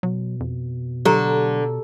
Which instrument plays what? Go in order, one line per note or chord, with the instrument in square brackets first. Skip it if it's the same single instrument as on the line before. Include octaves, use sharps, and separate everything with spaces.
[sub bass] B2 [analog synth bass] F#3
[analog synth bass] F2
[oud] D3 [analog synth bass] F#3 [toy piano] G4 A4 A#5